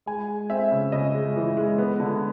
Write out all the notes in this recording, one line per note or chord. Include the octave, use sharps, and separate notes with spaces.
G#3 G#5
G#3
C4 E5
C#3
C#3 D#5
G#3
E3
G#3
B3
D3